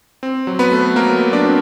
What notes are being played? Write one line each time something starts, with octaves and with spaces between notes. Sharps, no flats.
C4
F#3
B3 B4
A3
F#3 A#3 A#4
F#3
D4 D5
C4